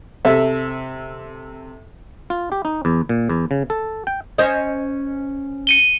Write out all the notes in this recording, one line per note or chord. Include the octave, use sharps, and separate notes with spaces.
C3 A4 E5
F4
G4
D#4
E2
A#2
E2
C#3
A4
G5
C#4 C5 D#5
C#7 D#7 G7